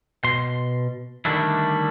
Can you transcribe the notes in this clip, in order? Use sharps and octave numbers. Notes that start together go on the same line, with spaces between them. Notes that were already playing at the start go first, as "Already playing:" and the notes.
B2 C6
D3 D#3 G3 A3 D4 E4